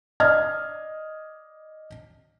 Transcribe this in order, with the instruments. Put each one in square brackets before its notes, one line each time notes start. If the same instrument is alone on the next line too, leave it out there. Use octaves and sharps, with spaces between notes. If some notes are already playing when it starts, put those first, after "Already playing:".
[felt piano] D5 D#5 F6 G#6